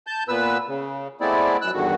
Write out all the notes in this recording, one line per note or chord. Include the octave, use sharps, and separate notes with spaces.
A5 G6
A#2 B3 B4 E6
C#3
G#3 A3 B3 C4 E4 D5
F#2 E6 F#6
E2 G2 D3 D#3 F#4